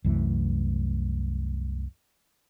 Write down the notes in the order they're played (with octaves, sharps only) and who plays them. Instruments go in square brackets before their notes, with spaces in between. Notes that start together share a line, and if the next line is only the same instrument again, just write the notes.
[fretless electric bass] C2 F#2 E3 A3